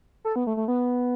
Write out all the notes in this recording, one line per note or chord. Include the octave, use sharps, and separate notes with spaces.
A4
B3
A3
A3
B3